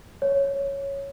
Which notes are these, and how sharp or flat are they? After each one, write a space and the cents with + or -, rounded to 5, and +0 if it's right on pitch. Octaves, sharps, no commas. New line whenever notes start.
C#5 +0